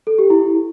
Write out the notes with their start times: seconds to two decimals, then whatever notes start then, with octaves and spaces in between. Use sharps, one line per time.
0.07 A4
0.18 G4
0.30 E4